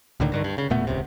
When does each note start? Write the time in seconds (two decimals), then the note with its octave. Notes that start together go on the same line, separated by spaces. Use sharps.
0.20 C#2 A2 D3 D#3
0.32 G2 D3 D#3
0.44 G2
0.58 C#3
0.70 E1 A#2 A3 B3
0.87 D#1 C#2 C3